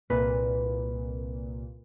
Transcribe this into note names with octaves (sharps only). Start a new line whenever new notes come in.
C2 A#2 B4